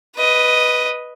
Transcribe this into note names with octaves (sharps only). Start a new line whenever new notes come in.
B4 D#5